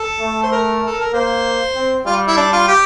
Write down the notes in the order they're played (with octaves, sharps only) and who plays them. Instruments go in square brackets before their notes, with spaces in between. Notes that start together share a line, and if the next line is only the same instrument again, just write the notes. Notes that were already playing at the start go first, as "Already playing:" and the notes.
Already playing: [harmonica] A4
[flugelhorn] A3
[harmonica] C5
A#4
A4
A#4
[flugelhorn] A#3 [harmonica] C5
[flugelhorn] C4
[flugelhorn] G3 [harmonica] F4
[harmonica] E4
D4
F4
G4